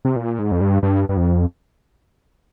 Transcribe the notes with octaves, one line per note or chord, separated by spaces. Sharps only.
C3
A#2
G#2
F2
G2
G2
G2
F2